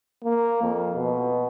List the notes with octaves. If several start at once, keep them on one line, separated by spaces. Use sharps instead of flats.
A#3
F2
B2